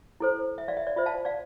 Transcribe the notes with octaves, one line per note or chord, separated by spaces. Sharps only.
E4 A4 C5
E5
D5 F5
E5
D5
F4 C5 E5
F5 A5
D5 F5